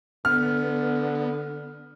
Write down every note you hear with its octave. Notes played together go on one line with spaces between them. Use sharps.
D3 B3 F6